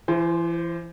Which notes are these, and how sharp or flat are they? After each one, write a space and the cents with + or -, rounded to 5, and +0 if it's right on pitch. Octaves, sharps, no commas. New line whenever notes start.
E3 +35 C5 +0